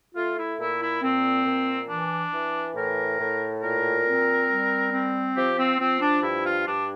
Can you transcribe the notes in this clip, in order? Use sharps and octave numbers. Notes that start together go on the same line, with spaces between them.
A3 F4
E4
A#2 E4
E4
A#2 C4
A#2
E3 D4
E3
A2 A#4
A2
A#2 A#4
C4
G3
C4
F3 G4
C4
F3 C4
D4
G2 E4
F4
G2 D4